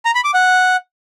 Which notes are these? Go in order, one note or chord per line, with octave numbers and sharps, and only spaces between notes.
A#5
B5
D6
F#5